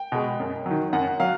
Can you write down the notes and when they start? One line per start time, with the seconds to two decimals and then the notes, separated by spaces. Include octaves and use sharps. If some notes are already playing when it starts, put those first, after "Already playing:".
Already playing: G5
0.12 B2 G#3
0.40 F#2
0.66 D#3 F#3
0.93 F#2 F#5
1.20 F#3 F5